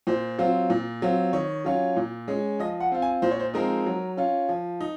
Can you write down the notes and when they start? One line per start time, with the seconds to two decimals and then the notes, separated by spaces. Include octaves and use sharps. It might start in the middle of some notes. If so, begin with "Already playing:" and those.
0.07 A#2 C5
0.38 F#3 C4 F4
0.70 A#2
1.02 F#3 C4 F4
1.33 D#3 C#5
1.65 F#3 C#4 F4
1.96 A#2
2.28 G#3 C#4
2.59 F3 D#5
2.80 F#5
2.92 C4 F4
3.02 G#5
3.22 A#2 C5
3.31 C#5
3.40 C5
3.54 F3 G#3 C4 D#4 A#4
3.86 F#3
4.17 C#4 F4
4.49 F3
4.81 D#4